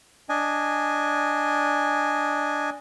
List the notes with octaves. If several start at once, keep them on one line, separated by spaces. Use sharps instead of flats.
D4 D#5 G#5